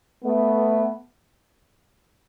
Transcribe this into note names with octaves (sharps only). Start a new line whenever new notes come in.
A3 B3